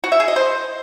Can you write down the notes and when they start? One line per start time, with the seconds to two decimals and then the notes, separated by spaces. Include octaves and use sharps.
0.04 F#4
0.12 E5
0.20 G#4
0.28 D#5
0.36 C5